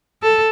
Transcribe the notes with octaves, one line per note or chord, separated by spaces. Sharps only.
A4